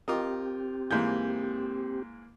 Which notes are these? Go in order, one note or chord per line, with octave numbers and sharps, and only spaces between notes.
C4 F4 G4 A#4 D#5
G#2 E3 A#3 G6